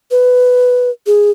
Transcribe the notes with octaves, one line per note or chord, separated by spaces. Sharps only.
B4
G#4